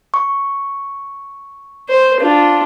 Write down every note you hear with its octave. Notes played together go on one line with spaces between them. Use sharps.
C#6
C5
D4 F4